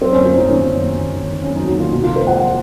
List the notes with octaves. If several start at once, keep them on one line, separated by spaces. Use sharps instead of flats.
F#3 C4
F#2 C#4
F4
F#3
D#4
D#3 C#4
F#2
D#3
D#3
D#3
D#3
F#3 C#4
F#3 D#4
F#4
D#3 F4
C3 D#4
F3 F4
C5
G#3 F#5
F3